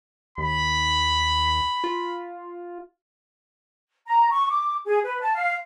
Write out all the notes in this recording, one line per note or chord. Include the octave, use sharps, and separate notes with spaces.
D#2 B5
F4
A#5
C#6
D6
G#4
B4
A5
F5